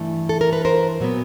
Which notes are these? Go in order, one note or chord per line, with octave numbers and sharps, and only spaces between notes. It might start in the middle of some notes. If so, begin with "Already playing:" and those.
Already playing: G2 E3 A3
A4
A#4
B4
A#4 C5
A#2 F#3 B3